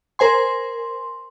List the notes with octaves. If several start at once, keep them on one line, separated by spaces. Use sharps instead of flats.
A#4 C5 G#5 C6